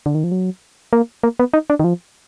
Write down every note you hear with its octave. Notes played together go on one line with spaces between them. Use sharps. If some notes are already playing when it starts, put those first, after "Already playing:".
D3
D#3
F3
F#3
A#3
A#3
B3
D#4
D4
D#3
F3